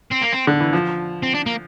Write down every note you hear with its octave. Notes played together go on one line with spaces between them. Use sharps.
C4
A#3
C4
D3
E3
F3
C4
D4
A#3